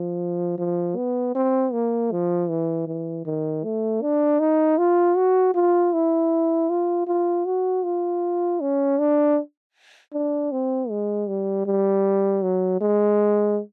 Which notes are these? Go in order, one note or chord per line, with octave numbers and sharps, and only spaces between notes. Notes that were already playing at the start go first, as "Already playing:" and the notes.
Already playing: F3
F3
B3
C4
A#3
F3
E3
E3
D#3
A3
D4
D#4
F4
F#4
F4
E4
F4
F4
F#4
F4
C#4
D4
D4
C4
G#3
G3
G3
F#3
G#3